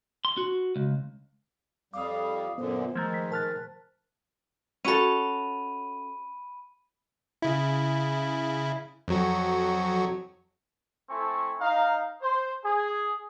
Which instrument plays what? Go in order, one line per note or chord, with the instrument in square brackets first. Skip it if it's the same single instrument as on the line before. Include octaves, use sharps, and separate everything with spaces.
[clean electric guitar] C6
F#4
C#2
[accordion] F2 G3 [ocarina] F5 [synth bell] D6 D#6
[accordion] F#2 A#2 D3 [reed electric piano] B3 [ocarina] C5
[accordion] D#3 G#3 [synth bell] F3 A3 [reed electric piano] A#5 G6 G#6
[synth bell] B6
[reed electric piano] A#4 F6 A6 [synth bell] A5 F#6
[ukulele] C#4 F#4 A4 [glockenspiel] B5 D#7
[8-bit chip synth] C#3 E4
F2 F#3 F#4
[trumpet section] A3 C4 E4 A4 G#5 C#6
D#4 F5
C5
G#4